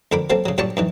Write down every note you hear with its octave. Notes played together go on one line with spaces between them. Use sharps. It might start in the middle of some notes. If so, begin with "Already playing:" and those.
F2 D3 A#4 B5 D6
F#3 A#3 C4 A4
C#3 F#3
A#2 F#3 G3 D4 A5 C#6
F#2 D#3 E3